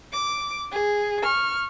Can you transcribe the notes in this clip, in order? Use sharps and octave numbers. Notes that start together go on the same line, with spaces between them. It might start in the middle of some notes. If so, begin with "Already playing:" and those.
D6
G#4
C#6 F6